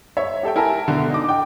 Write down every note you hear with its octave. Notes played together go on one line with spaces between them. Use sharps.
C#5 E5
G4 A4 E5 G5
E4 A#4 G#5 A5
B2 D3
D#4 D6
G5 D6